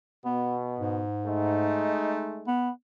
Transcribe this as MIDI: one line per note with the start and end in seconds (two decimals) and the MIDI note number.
0.25 1.04 47
0.25 0.59 59
0.79 1.95 44
1.25 2.55 56
1.25 2.55 57
1.25 2.55 63
2.47 2.70 59